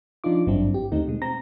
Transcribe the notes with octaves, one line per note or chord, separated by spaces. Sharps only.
F3 D4 D#4 F4 D6
G#1 G2 F#3 C4 D4 E4
G4
D#2 D3 D#3 A3 C4 D#4
B2 G#3
C4 A#5 A#6